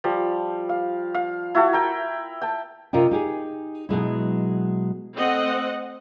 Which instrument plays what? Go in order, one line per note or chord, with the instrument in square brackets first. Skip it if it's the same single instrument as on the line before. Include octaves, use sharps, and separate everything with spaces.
[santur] F3 G3
F5
F5
E4 F#4 A4
A#4 G5
G5 A5
[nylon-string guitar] C3 F4 A#4 D#5 G5
D#4 G4 G#4
B2 F#3 G#3 E4
[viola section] A3 C4 D#5 F#5